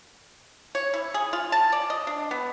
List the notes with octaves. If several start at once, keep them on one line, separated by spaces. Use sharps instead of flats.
C#5
E4
G#4
F4
A5
D5
D#5
D4
B3